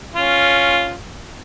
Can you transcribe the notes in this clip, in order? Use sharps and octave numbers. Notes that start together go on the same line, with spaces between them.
C#4 F4